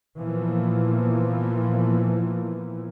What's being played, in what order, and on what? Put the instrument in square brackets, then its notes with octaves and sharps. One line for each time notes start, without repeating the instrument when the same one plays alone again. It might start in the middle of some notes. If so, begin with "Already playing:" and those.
[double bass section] A#2 E3 F3 A#3 B3